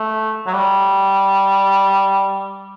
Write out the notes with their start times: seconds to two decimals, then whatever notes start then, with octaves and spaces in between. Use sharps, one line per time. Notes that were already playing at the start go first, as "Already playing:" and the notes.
Already playing: A3
0.47 F#3
0.54 G3